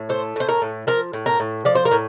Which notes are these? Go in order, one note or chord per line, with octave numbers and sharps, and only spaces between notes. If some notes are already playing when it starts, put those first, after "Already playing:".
Already playing: A2
A3 C5
A2 C5
A#4
A2
F3 A#4
A2
A#4
A2
F3 D5
C5
A#4
A2